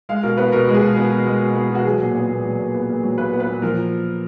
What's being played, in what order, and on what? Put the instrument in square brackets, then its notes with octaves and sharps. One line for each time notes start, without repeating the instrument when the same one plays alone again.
[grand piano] G#3 F5
B2 A#4
B3 B4
B2 A#4
G#3
G#4
B2
B3
B2
G#3
B2
B3
B2 F#4
F#3 G#4
A#2
B3
A#2
F#3
A#2
B3
A#2
F#3
A#2 B4
B3
B4
A#2
F3 A#4